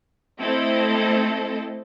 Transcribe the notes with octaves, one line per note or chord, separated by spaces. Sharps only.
A3 C4 E4 A4 D#5